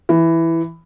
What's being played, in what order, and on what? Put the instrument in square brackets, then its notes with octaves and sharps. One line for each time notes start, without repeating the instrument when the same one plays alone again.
[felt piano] E3